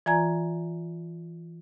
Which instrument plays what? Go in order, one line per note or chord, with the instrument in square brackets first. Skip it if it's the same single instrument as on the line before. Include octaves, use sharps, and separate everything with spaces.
[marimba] E3 F4 D5 G#5 A#5 G#6